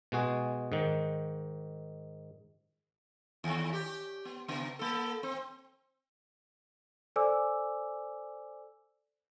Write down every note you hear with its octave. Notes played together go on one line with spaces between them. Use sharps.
B2 G#3 F#4 G#4
G#2 D#3
D#2
G4
B3
C#3 B3
A#3 A4
C4
A4 C5 D5 G#5 D6 E6